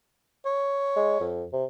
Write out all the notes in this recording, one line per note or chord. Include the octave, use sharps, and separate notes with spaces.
C#5
G#3
F2
C3